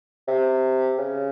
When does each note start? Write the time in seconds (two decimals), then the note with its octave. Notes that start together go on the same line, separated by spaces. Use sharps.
0.28 C3
0.99 C#3